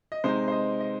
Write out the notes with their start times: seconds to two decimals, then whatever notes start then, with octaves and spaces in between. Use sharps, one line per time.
0.12 D#5
0.24 C3 G#3 D#4 C5
0.48 C5
0.52 D#5
0.80 D#5